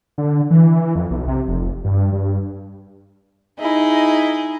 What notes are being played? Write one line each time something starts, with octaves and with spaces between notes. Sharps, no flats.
D3
E3
F2
B1
C3
F1
G2
G2
D#4 E4 G#4 D#5